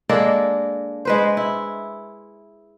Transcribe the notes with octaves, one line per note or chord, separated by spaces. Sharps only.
G#3 A#3 D4 A4
G#3 B4 C5
E4